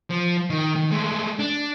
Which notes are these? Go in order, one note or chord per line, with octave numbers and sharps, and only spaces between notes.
F3
D#3
D#3
G#3 A3
D4